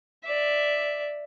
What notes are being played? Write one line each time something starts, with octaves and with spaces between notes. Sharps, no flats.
D5 E5